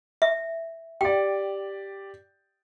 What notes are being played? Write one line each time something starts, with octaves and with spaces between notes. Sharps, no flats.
E5
G4 D5 G5